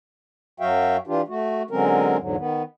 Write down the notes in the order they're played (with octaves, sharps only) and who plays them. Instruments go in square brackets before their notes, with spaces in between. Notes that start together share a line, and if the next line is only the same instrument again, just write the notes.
[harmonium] F#2 F#3 F#4 E5 F5 G5
E3 D4 F4 G4
A3 F#4
D3 F#3 G#3 C4 C#4 A#4
E2 G#2 D3 F#3
D#3 B3